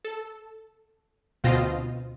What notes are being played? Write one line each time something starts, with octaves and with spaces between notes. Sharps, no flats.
A4
D2 B2 C4 F4 C5 D#5